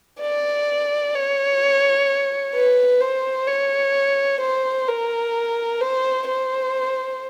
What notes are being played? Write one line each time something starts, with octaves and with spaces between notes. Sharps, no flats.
D5
C#5
B4
C5
C#5
C5
A#4
C5
C5